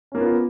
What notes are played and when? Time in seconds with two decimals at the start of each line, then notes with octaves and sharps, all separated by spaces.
0.12 C#4
0.15 A#3
0.18 F4
0.21 B3